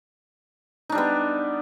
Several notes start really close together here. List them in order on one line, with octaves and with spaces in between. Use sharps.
D#4 D4 G3 B3